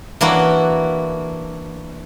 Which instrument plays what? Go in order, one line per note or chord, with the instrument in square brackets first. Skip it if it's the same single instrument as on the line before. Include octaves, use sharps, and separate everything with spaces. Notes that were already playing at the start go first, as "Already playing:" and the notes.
[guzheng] E3 A#3 D4 E4 F#4